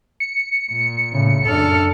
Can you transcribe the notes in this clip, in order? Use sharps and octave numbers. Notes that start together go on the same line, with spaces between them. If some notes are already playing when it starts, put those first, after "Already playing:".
C#7
A#2
A2 C#3
F#2 D4 A4 F6